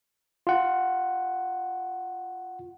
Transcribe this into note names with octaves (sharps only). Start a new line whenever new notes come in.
F4 F#5